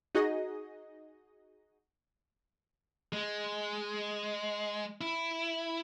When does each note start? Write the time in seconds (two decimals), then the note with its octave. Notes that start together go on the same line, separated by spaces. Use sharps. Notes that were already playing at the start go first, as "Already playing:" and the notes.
0.15 D#4 F#4 G#4 D#5
3.13 G#3
5.01 E4